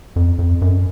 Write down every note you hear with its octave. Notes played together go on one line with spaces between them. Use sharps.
F2
F2
F#2